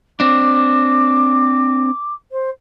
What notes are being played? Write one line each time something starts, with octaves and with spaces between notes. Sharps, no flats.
C4 D4 D6
C5